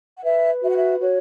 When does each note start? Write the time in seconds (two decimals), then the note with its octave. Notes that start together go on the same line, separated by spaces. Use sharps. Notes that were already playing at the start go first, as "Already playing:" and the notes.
0.16 F#5
0.23 B4 E5
0.62 F#4 E5
0.69 F#5
0.76 E5
0.99 F#4 C#5